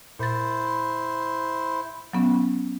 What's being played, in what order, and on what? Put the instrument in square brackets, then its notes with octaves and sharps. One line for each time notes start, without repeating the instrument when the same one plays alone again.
[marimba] A#2 A6 [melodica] E4 C5
[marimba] F#3 B3 C#4